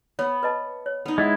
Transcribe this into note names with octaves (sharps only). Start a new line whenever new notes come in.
B3 C#5
B4 D#5 A5
C#5
B3 D#4
G#3 E4 D#5 F#5